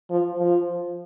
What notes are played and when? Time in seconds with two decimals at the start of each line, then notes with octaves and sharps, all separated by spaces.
0.10 F3
0.39 F3